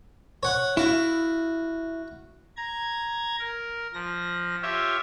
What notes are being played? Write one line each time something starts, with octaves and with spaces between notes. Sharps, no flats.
C#5 F#5
E4 F#4 F5
A#5 G#6
A#4
F3 A#6
F4 G4 C#5 E5